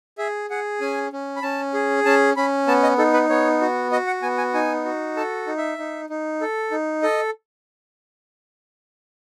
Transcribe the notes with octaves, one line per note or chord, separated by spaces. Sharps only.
G#4 E5
G#4 F#5
C#4 G#5
C#4
B5
C#4 A5
G#4
C#4 A5
C#4 B5
B3 A5
D#5
D#4 A4
B4
B3 C#5
F#4
F#4 D#5
F#5
B3 G#5
G#5
D#4 G#5
F#4
A4 A5
D#4
E5
D#4
D#4
A4
D#4
A4 D#5